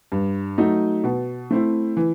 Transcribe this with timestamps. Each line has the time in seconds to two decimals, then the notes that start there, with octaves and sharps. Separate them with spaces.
0.12 G2
0.58 F#3 A3 D#4
1.04 B2
1.51 A3 C4 E4
1.97 E3